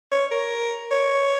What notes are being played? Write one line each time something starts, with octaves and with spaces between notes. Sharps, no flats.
C#5
A#4
C#5